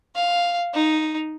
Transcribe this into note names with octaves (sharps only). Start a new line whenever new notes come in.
F5
D#4